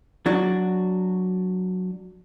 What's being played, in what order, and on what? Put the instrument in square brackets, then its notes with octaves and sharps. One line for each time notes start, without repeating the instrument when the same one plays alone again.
[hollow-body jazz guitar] F#3 D4 F#4